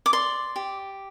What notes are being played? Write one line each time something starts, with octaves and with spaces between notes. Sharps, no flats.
D6
D5 C6
G4